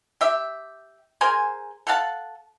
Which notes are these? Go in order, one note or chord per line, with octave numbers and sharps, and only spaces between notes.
G4 E5
G#4 A#4 C5 G#5
A4 F5 F#5 A5